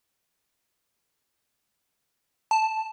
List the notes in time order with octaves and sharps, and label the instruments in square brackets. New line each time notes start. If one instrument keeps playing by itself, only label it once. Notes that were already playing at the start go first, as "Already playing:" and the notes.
[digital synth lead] A5